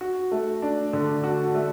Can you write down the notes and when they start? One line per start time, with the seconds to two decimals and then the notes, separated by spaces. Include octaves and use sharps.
0.01 F#4
0.32 A3
0.62 D4
0.93 D3
1.24 F#4
1.55 A3